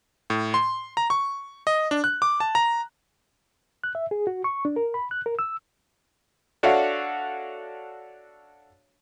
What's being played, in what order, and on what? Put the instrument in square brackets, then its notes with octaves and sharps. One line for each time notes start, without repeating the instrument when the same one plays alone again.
[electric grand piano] A2
C6
A#5
C#6
D#5
D4
F#6
D6
A5
A#5
[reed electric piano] F#6
E5
G#4
F#4
C#6
D4
A#4
B5
F#6
A#4
E6
[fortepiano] D4 F#4 A4 C#5 E5 F5